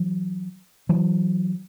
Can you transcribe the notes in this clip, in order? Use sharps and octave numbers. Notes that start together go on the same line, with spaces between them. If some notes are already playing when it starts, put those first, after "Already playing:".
Already playing: E3 F#3
E3 F#3